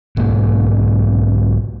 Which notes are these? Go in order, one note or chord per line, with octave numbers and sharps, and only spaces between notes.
B1 G#2 A#3